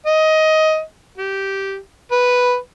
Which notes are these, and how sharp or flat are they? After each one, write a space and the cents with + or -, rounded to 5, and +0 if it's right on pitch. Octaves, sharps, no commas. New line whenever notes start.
D#5 +15
G4 -10
B4 +0